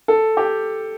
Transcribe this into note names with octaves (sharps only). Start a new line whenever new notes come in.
A4
G4